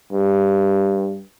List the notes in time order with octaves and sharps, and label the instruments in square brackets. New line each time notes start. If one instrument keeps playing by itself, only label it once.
[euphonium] G2